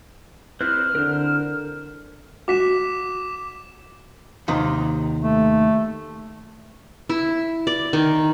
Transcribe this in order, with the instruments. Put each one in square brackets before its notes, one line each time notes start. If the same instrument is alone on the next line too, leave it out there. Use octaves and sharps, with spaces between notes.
[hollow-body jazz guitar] C4 E4 [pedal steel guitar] B4 C5 F#6 [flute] F6
[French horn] D3 [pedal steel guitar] A#4 C5
[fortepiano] F#4 [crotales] D6 B6 E7
[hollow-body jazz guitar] D#2 C3 D#3
[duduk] A3
[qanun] E4
D5
D#3